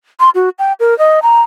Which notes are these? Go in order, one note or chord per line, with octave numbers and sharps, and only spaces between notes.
C6
F#4
G5
A#4
D#5
A#5